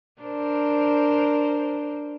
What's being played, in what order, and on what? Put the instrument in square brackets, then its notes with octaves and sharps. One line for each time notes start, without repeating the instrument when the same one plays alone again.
[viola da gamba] D4 A#4 C5